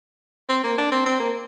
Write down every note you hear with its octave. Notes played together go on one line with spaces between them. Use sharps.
C4
A#3
D4
C4
C4
A#3